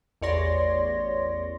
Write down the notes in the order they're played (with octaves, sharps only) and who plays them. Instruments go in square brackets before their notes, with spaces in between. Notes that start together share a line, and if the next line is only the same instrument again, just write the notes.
[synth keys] A1 E2 C#5 D5 C6 A#6